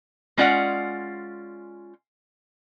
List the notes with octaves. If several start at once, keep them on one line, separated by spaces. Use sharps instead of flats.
G#3 C#4 F4 D5 F5 F#5